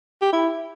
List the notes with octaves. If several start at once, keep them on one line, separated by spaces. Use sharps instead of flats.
G4
E4